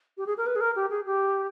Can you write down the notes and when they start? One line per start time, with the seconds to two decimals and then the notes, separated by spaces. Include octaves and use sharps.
0.17 G4
0.26 G#4
0.37 A#4
0.46 B4
0.56 G#4
0.61 A#4
0.76 G4
0.90 G#4
1.06 G4